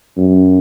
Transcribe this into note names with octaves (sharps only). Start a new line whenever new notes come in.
F#2